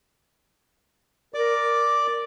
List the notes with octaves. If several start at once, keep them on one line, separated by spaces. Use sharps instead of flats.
A#4 D5 D6